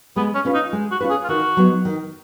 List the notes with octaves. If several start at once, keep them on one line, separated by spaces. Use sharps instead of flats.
G#3 B3
C#4
C#4 F4 B4
D#4
G#3
F#4
C#4 F4 B4
G#4
F4
D#3 F#4
F#3 B3 D#4
D#3